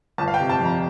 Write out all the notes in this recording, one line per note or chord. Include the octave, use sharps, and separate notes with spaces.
G1 A5
F5
G5
C3
A5
F2
A#5